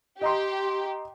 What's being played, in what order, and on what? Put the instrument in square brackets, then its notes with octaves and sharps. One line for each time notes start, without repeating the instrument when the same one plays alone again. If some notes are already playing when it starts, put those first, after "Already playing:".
[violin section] G4 [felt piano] D#5 A#5 C6